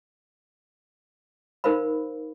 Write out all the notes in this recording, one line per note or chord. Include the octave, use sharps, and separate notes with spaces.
D#4 A#4 C5 F5 B5